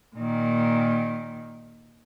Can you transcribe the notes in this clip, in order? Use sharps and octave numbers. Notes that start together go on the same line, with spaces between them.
A#2 D#3